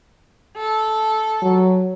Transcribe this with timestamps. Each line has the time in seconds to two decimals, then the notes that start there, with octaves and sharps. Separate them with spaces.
0.57 A4
1.42 F#3